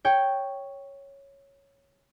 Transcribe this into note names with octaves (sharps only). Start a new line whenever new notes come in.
C#5 G5